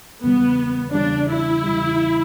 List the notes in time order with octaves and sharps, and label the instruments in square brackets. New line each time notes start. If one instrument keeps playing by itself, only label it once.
[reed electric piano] E2 C#3 G3 [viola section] B3
[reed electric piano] E2 C#3 G3 [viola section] D4
[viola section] E4
[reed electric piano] E2 C#3 G3